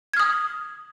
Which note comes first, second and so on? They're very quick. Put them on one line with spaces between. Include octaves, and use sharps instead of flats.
G#6 F6 D#6